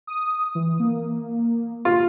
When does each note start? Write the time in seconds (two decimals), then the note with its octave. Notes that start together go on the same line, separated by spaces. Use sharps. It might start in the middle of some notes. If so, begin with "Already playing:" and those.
0.07 D#6
0.55 E3
0.80 A#3
1.85 F4